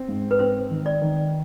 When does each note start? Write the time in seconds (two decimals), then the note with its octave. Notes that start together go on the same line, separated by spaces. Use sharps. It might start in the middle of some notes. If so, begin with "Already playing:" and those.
Already playing: C4
0.08 G#2
0.31 B4
0.39 C4 C5
0.71 D#3
0.86 D5
1.02 D#3